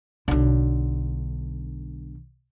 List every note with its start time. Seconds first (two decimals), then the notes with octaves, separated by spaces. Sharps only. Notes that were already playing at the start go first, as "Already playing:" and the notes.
0.28 B1 D3